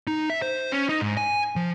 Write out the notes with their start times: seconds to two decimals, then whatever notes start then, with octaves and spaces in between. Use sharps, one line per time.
0.07 D#4
0.30 E5
0.42 C5
0.72 C#4
0.89 D#4
1.01 G#2
1.17 G#5
1.56 F3